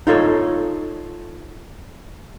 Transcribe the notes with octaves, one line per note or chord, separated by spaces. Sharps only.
D#4 F4 A4 C#5